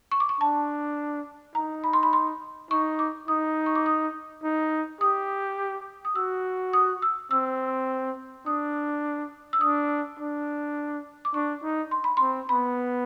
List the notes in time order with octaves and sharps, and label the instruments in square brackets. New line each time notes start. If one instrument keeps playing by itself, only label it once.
[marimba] C#6
D6
C#6
[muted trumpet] D4 [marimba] A5
[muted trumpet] D#4 [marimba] A#5
[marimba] B5
C6
B5
C6
[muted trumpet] D#4 [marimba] C#6
[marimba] D6
[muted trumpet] D#4 [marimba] D#6
[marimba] C#6
D6
D#6
[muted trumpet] D#4
[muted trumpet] G4 [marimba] D#6
[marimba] D#6
[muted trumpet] F#4 [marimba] E6
[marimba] D#6
E6
[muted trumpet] C4 [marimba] E6
[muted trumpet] D4 [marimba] D#6
[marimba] E6
[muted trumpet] D4 [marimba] D#6
[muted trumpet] D4
[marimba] D6
[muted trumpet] D4 [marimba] C#6
[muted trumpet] D#4
[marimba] C6
B5
[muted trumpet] C4 [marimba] C6
[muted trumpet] B3 [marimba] B5